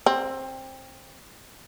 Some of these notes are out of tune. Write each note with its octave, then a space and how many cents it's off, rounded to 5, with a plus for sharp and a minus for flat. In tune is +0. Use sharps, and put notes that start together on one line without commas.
C4 +20